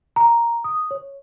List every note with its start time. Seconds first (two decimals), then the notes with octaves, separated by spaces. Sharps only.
0.16 A#5
0.64 D#6
0.91 C#5